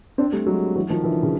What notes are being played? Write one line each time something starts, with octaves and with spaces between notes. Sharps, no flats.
C4 D4
G3 A3
F#3 G#3
E3 F#3
D#3 F3
D3 E3
C#3